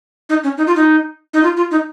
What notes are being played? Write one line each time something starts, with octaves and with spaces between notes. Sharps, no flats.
D#4
C#4
D#4
F4
D#4
D#4
F4
F4
D#4